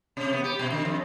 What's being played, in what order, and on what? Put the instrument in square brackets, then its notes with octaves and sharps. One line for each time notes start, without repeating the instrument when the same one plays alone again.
[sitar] C3
B3
G4
B2
D3
F2